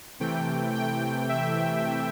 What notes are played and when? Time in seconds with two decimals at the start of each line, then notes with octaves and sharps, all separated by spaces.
0.20 C3 E3 A3 G5
0.75 G5
1.29 E5